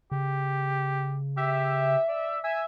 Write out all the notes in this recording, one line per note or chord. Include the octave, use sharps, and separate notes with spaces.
C#3 G4
G4 E5
D5
E5 G#5